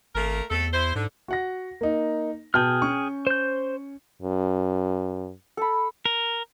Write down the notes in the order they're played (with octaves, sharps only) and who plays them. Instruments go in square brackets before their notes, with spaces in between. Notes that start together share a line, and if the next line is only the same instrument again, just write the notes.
[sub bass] G#1 [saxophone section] A3 A#3 A#4
[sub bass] E2 [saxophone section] A3 C4 A4
[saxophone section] E4 C5
[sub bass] G#2 [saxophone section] D3
[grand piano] F#4 F#5 A#6
A#3 D#4
[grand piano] B2 A5 G6 [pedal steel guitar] G#4 G5 F6
[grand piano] C#4 C#6
[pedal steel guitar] C5 G6
[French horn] F#2
[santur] A4 B5
[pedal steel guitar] A#4